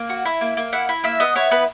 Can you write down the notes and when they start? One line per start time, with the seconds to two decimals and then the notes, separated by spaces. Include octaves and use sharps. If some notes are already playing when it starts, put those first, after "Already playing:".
Already playing: A#3
0.10 F#4
0.25 E4
0.41 A#3
0.57 A#3
0.73 E4 F#5
0.89 E4
1.04 A#3 E5
1.20 B3 D#5
1.35 E4 C#5
1.51 B3 B4